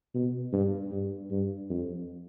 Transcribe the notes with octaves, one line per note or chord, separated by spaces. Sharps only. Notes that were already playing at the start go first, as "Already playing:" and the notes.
B2
G2
G2
G2
F2